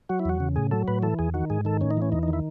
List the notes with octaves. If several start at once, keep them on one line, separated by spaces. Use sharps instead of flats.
F#3 F#4
E4
E2 F#4
C#3
A2 G#4
F#3 A4
A2 B4
E3 A4
E2 G#4
D#3 F#4
G#2 G#4
D#3 A4
A2 C#4
D#4
E3 C#4
E2 D#4
D#4
D#3
E4